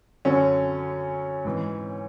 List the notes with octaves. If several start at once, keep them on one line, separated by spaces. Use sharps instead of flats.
F#2 D3 F#3 C#4
G#2 E3